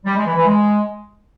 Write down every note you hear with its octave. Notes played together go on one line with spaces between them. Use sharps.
G3
G#3
E3
E3
G#3